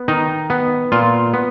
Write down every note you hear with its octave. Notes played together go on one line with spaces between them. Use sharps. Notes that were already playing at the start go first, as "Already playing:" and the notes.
Already playing: B3
D#3 D#4
B3
A#2 F4
B3